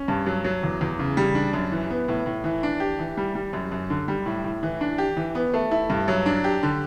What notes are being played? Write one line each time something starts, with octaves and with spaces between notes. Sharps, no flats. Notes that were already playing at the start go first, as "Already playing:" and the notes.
Already playing: C#4
G2
F#3
F#3
E2
E2
C#3
G3
D4
F#2
E3
B3
A2
A2
E3
D4
G4
E3
G3
G3
F#2
F#2
D3
G3
A2
A2
E3
D4
G4
E3
B3
A3
E4
G2
F#3
D4
G4
D3